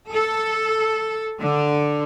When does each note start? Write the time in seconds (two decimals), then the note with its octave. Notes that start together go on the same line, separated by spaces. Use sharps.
0.10 A4
1.39 D3